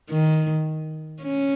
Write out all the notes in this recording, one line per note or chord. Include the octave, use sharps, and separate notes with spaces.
D#3
C#4